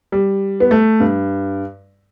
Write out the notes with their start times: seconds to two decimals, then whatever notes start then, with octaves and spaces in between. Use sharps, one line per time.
0.12 G3
0.60 B3
0.71 A3
1.00 G2